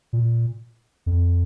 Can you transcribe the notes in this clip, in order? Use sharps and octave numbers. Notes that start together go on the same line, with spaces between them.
A#2
F2